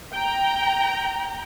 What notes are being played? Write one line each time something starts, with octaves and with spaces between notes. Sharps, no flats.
G5 A#5